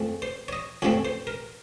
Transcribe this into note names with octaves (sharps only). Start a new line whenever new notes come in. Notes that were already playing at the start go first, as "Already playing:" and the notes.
Already playing: F2 C#3 F3 A3 C4
C5
C#5
D#5
F2 C#3 F3 A3 C4 C#5
C5
A#4